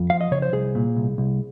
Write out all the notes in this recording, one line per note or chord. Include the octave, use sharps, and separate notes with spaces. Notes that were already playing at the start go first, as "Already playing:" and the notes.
Already playing: F2
F3 F5
D#5
C#3 C#5
C5
C2 G#4
A#2
C2
C2